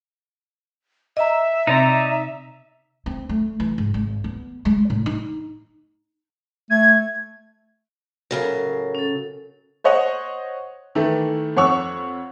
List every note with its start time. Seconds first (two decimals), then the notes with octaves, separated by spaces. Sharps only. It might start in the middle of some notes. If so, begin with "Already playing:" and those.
1.17 D#5 E5 A#5
1.67 C3 C4 D#4 D5 A#5
3.06 C4
3.29 A3
3.60 E3
3.78 G#2
3.94 G#1
4.24 B3
4.65 G#3
4.90 A2
5.06 D#4
6.71 A3 G#6
8.31 A2 C#3 F#3 A4 A#4
8.95 C#4 A4
9.84 C5 C#5 D#5 F#5
10.95 D#3 E3 A3
11.57 F2 C#5 F#5 C#6 E6